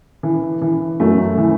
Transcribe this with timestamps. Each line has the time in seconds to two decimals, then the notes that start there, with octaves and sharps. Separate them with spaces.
0.23 E3
0.62 E3
1.00 F#2 A3
1.38 E3